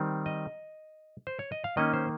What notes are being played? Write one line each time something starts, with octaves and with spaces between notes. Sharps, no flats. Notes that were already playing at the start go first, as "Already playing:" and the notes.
Already playing: D#3 G3 C4
D#5
C5
C#5
D#5
F5
D#3 A#3 C#4 D#5
C5